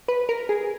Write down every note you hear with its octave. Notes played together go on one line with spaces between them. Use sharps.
B4
A#4
G#4